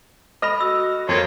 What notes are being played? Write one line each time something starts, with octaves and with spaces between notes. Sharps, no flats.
A4 D#5 B5 F6 A#6
F#4 E6
F2 A#3 F4 C#5